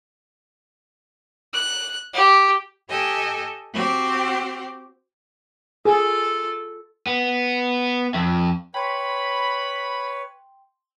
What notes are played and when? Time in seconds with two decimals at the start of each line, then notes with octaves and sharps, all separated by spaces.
1.53 F#6
2.14 G4
2.88 G4 A4 D#5 G5 G#5
3.73 C4 F#4 G4 C5
5.85 F4 G#4 A4
7.07 B3
8.14 F2
8.74 B4 C#5 G5 B5 C6